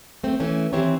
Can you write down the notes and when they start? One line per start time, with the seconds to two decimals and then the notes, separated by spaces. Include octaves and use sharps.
0.24 A3 C4
0.40 E3 A3 C#4
0.73 D#3 E3 C4 E4 G4 C#5